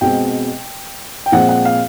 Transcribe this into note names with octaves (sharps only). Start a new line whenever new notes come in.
B2 G#3 C4 G5
G5
A#2 F3 G#3 C4 F#5
F#5
F5